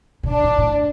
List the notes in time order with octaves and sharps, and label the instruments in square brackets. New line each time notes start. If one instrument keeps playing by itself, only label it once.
[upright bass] B2
[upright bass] A#2 [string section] D4
[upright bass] A2
A2